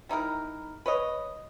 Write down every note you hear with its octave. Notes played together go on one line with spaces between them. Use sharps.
G3 D#4 E4 A#4
B4 C#5 D#5